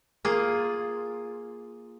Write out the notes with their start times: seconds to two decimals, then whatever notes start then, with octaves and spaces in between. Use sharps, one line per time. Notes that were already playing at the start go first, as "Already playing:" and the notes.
0.25 A#3 F4 G#4